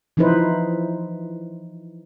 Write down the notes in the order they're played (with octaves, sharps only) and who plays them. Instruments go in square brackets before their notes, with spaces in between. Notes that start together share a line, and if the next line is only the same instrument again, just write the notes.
[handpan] E3 F3 D#4 E4 B4 C5